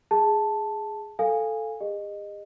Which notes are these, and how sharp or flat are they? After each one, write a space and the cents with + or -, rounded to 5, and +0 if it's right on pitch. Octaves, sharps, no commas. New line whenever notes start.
G#4 +0 A5 +0
A4 +0 F5 +0 G#5 -15
G#4 -45 D#5 -20